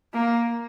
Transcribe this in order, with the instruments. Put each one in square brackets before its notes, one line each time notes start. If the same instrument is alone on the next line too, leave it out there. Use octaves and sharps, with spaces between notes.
[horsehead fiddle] A#3